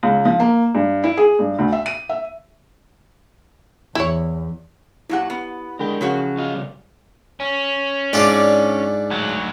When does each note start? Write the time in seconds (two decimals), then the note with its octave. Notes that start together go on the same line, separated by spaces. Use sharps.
0.03 C#2
0.25 F3
0.40 A#3
0.75 G2
1.04 E4
1.17 G#4
1.39 G2
1.58 D2
1.73 E5
1.86 D#7
2.09 E5
3.95 E2 E4 C#5
5.09 A#2 F#3 E4 G4 F#5
5.30 B3
5.79 D3 G#3 A#4 G5 B5
6.01 C#3 F3 F#3 F#4
6.37 F4 D#5 F5
6.54 C#3 G3
7.40 C#4
8.13 G#2 D4 F4 D5
9.10 D2 F#3